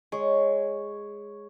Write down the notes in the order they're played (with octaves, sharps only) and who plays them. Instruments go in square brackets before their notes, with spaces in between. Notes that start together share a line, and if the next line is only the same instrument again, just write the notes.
[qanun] G#3 [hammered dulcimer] C#5